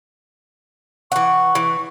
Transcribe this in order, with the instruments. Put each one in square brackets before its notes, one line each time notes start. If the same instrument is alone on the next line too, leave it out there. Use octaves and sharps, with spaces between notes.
[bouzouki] E3 F#5 [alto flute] C#6
[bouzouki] E3